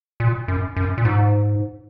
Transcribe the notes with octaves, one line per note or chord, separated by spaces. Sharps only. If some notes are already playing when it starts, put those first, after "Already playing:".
A#2
F#2
F#2
A#2
G#2